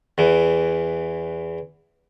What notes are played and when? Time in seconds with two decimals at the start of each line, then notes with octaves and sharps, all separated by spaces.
0.18 E2 E3